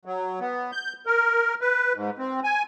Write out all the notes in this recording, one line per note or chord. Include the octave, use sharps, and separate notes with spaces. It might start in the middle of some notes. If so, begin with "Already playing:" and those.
F#3
B3
G6
A#4
B4
G#2
C4
G#5